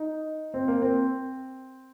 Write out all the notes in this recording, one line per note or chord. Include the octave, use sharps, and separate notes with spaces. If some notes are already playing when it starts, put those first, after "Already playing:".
Already playing: D#4
C4
A#3
C4